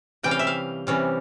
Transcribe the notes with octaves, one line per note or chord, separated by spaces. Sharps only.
C3 E3 G3 C#4 G5
F5
E5
F5
C3 E3 G3 C#4